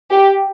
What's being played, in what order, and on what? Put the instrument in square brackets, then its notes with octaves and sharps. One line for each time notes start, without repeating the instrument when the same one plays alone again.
[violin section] G4